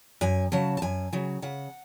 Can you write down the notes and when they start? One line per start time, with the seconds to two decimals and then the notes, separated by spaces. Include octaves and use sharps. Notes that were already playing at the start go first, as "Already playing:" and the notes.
0.21 F#2 G#5
0.52 C#3 F#3 A5
0.77 A5
0.82 F#2 G#5
1.13 C#3 F#3
1.42 C#3 F#5